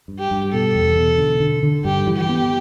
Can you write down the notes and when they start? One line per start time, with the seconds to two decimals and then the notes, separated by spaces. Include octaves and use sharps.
0.08 G2
0.19 G4
0.31 G2
0.52 B2 A4
0.75 E2
0.96 B2
1.18 D3
1.40 D3
1.63 D3
1.85 G2 G4
2.07 E3
2.17 G4
2.29 B3